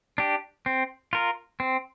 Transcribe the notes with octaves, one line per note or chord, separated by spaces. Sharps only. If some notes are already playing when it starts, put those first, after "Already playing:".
D4 G4
C4
F4 A#4
C4